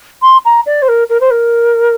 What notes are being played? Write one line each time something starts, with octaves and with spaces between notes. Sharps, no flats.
C6
A#5
D5
C5
A#4
A#4
C5
A#4